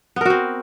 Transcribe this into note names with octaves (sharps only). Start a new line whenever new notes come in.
B3 C4 F#4 A#4